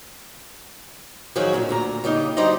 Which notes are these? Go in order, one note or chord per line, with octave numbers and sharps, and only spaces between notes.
D#3 F3 F#3 F#4 G#4
A#2 D3 F#3
D2 A#2 A#5
C#3 G3 A#3 D#4
F#3 G3 D#4 C5 D5 D#5